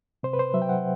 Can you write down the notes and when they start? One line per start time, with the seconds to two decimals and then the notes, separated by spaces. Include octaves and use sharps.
0.23 C3 C5
0.33 B4
0.39 C5
0.54 F#3 E5
0.62 G5
0.69 F#5